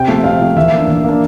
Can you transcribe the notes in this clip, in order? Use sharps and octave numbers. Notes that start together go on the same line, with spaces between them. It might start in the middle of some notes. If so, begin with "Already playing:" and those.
Already playing: C3 G5
F3 A3
C3 F5
F3 A3
E3 E5
A#3
D4
E3
A#3 D4